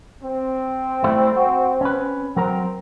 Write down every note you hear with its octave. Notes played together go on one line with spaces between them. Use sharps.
C4
G3 A3 E4
F#4
C#4 B4
F#3 C4 A#4 A#5